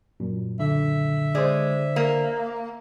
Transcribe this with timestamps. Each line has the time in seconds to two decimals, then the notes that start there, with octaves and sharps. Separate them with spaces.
0.20 F#2 A#2
0.60 D3 E5
1.35 G#3 C5 D5
1.96 A#3